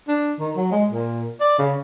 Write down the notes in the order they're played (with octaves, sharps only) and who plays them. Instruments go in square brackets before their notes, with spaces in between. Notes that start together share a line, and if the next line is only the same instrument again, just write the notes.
[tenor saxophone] D4
D#3
F#3
G#3
A#2
D5
C#3